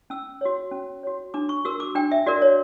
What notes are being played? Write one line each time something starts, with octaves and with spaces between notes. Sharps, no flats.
C#4 E6
F#4 C#5
C#4
F#4 C#5
D4 D6
C#6
F#4 A#4 E6
D6
D4 G5
E5
F#4 A#4 D5
C#5